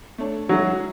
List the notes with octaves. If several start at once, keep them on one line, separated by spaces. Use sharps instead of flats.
A3 D4 A4 C#5
F#3 G#3 C#4 E4 G#4